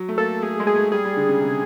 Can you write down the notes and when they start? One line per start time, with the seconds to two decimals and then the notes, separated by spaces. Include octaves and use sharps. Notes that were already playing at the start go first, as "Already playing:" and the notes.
Already playing: F#3
0.09 A3
0.18 A#3 A4
0.42 A3 G#4
0.60 G#3
0.67 G#4
0.75 A3
0.92 G3 G#4
1.05 G3
1.16 D3
1.29 C#3
1.41 C3